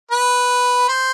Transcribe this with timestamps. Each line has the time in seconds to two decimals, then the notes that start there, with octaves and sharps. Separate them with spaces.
0.11 B4
0.88 C5